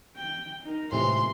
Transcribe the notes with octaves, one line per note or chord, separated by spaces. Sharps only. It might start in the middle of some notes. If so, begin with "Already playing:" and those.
G5
D#4 A#4
A2 C3 E3 G#3 F4 C6